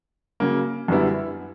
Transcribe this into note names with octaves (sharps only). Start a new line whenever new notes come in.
C#3 F#3 A#3
F#2 D3 G3 B3 E4